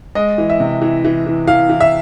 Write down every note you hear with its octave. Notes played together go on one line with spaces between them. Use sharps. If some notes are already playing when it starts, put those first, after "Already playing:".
G#3 D#5
E3
E5
C3
E3
E3
E3
E3 F5
E3
E5